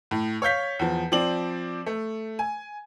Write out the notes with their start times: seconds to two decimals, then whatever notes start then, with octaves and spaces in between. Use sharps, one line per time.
0.11 A2
0.42 C#5 F5 G6 B6
0.79 E2 F3
1.12 F3 C4 D5 F#7
1.86 A3
2.39 G#5